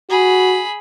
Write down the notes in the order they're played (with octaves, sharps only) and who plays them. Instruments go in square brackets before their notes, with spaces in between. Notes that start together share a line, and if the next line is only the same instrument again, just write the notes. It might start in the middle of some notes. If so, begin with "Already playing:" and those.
[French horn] F#4 [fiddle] G#4 B5